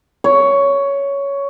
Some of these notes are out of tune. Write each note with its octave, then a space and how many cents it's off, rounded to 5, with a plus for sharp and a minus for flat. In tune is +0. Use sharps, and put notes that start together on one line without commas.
C#5 +10